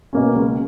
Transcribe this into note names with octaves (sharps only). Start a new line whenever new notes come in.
B2 A#3 C#4
C#2